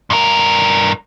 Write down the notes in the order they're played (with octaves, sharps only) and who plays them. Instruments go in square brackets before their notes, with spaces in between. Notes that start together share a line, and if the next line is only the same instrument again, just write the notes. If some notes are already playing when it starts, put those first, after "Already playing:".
[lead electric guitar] G2 A#4